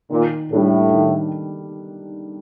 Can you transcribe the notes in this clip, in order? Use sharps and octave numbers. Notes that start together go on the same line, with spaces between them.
A#2 D#3
A2 G3 D4 A4
D#3